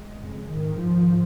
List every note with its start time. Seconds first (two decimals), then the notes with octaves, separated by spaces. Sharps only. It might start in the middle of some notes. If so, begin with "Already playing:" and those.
Already playing: G#3
0.17 F2 C#3
0.48 G#2 D#3
0.79 G#2 F3